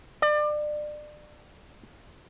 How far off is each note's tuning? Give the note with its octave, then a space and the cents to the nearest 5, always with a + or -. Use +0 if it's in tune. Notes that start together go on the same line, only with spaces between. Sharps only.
D5 +30